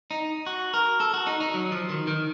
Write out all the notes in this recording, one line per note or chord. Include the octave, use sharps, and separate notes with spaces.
D#4
F#4
A#4
A4
F#4
D#4
D#4
F#3
F3
D#3
D#3